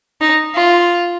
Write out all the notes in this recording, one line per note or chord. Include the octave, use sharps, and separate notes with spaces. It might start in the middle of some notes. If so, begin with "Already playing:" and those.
D#4
F4